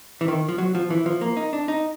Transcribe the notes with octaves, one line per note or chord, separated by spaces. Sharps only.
E3
D#3
F3
F#3
F3
E3
F3
A#3
D#4
D4
D#4